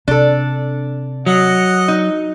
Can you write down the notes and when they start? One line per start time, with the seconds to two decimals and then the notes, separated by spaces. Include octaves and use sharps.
0.08 C3 D4 A4
1.26 F#3 D#5 F#5
1.88 D#4